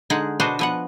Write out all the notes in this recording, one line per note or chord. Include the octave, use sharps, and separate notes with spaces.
D3 G#3 D#4 G#4 F#5
B2 D4 F#4 B4 C5 D#5
F3 B3 F#5